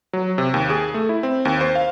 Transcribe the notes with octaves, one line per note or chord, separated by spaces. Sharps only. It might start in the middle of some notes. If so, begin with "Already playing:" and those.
F#3
C3
D#2
G#4
A3
E4
C4
D#2
C5
F5